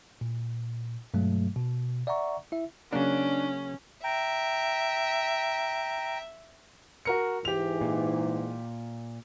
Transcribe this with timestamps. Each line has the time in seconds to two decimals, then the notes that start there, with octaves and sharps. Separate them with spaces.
0.21 A#2
1.14 G2 B2 F#3 G#3 A3
1.56 B2
2.07 D5 E5 F#5 A#5 C#6
2.52 E4 E5
2.93 C#3 F#3 A#3 C#4 D4
4.04 E5 G5 A#5
7.05 F#4 A#4 C#7
7.45 G#2 E3 G4 F7
7.81 A#2